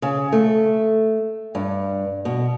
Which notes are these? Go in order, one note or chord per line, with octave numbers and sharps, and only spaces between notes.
C#3
A3
G2
B2